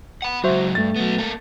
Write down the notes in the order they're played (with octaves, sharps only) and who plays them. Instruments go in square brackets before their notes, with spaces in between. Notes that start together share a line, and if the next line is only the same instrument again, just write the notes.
[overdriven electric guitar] F#5 B5
[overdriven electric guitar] C#2 F#3 [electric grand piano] F#4 C5 E5
[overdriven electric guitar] G2 [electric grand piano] A3 A6
[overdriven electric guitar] F#3 B3
A#3 A4